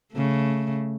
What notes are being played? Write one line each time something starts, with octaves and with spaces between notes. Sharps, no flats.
C#3 A3